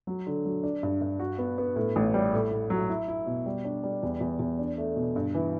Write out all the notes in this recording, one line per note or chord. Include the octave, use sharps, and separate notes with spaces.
F#3
D3
F#3
D4
G2
G2
F#4
B3
B3
A2
A1
G3
A2
A2
F#3
E4
E4
B2
G3
D4
G3
E2
E2
E2
D4
A3
B2
G2
E3